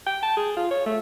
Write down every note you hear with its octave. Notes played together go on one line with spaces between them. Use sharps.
G5
A5
G#4
F4
C#5
A3